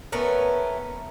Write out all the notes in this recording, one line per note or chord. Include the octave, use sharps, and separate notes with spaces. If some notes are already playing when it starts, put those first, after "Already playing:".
A3 B3 C#4 A#4